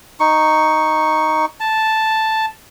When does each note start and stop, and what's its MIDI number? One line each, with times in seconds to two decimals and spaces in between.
0.20 1.45 63
0.20 1.45 85
1.60 2.46 81